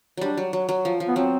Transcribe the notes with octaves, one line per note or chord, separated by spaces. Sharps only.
F#3 G3 D4
F#3
F#3
F#3
F3
F3
B3
F#3 C4